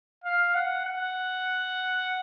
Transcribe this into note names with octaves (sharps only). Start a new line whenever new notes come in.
F5
F#5
F#5